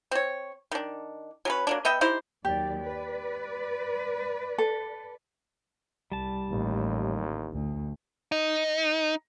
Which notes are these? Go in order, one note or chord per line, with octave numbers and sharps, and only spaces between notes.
C4 C#5
D#3 D4
F#3 C#4 B4
F#3 A#3 D4
B3 D#5 E5 G5
D#4 E4 G4 C5
D#2 F#3 G4 D5
B4 D5
A4
C2 G3 A5
A1 D#2 A2
D2
D#4